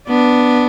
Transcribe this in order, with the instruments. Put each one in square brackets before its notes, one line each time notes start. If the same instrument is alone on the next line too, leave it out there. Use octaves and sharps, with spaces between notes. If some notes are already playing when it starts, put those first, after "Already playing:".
[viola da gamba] B3 D4